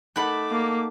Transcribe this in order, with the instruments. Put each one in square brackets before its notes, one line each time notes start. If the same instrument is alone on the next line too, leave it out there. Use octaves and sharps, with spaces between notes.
[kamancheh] A3 D6 [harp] D#4 A4 F#5 [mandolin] B5 F#6
[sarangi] A#3